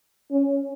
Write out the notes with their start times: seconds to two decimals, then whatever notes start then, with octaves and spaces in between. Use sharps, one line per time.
0.31 C#4